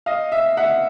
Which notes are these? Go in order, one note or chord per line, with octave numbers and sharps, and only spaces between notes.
D#5 F5
E5
E5 F#5